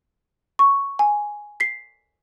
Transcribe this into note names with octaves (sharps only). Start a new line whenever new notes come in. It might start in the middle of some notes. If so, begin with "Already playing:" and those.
C#6
G#5
B6 C7